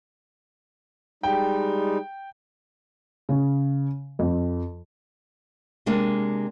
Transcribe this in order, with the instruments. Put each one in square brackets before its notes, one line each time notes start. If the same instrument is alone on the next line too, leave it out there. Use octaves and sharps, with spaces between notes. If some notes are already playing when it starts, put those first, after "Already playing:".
[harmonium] G3 G#3 D#4 [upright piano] G5
[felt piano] C#3
F2
[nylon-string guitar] C3 G#3 A#3 D4